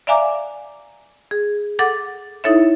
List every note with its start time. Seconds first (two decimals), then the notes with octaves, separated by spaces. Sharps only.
0.07 D5 E5 F5 G#5 A#5 D6
1.31 G#4
1.79 A4 F#5 D6
2.44 D#4 E4 A4 C#5 E5